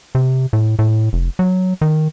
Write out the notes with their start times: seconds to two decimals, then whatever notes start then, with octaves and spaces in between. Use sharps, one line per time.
0.15 C3
0.53 A2
0.79 A2
1.13 F1
1.39 F#3
1.81 D#3